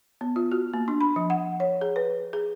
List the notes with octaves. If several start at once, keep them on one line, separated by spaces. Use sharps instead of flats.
B3
F4
F#4
A#3
D4
B5
F3
F#5
C#5
G#4
B4
G#4